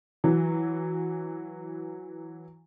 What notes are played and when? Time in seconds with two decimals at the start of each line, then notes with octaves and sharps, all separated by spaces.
0.24 E3 F#3